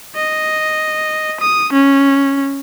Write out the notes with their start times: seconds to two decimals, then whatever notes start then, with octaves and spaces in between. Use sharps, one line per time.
0.16 D#5
1.41 D#6
1.72 C#4